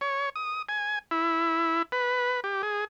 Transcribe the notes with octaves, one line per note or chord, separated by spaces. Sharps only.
C#5
D#6
G#5
E4
B4
G4
G#4